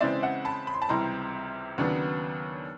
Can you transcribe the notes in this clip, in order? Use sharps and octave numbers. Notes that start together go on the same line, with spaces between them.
C#3 E3 G#3 C4 D5 E5
E5 F#5
A5 B5
B5
C6
A5 B5
C#2 C3 E3 G3 A#5 C6
D#2 C#3 F#3 B3 D4